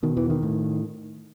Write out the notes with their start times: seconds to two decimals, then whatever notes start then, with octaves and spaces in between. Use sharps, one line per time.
0.03 B2 D#3
0.16 E2 E3
0.30 D#3
0.43 A2